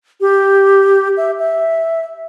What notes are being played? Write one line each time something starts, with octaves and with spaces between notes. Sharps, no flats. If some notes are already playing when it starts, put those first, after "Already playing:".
G4
E5
E5